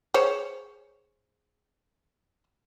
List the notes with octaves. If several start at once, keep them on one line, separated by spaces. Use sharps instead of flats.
G#4 C5 C#5